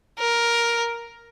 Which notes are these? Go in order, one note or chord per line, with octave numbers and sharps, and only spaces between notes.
A#4